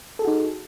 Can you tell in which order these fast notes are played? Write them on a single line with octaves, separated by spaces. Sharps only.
A4 G#4 F#4 D#4